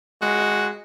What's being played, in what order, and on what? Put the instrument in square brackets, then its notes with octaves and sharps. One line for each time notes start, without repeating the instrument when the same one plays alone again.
[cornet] G#3 [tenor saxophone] F#4